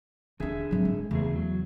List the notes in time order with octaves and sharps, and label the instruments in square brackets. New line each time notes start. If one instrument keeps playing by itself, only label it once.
[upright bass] D#2 D4 [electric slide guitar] D3 G#4 E5
[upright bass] G#1 F#3
G#3
[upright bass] E2 [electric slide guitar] C#3 A3 G#4
[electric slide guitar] F#3